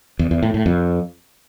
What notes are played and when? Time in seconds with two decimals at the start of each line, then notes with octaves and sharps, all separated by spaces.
0.19 E2
0.31 E2
0.43 A2
0.54 A2
0.66 F2